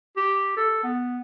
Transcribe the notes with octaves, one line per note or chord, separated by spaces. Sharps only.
G4
A4
B3